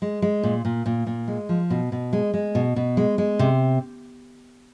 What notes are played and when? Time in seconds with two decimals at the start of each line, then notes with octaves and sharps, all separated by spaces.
0.02 G#3
0.22 G#3
0.43 A#2
0.65 A#2
0.86 A#2
1.07 A#2
1.28 G#3
1.49 F3
1.70 B2
1.92 B2
2.13 G#3
2.34 G#3
2.55 B2
2.76 B2
2.97 G#3
3.18 G#3
3.39 C3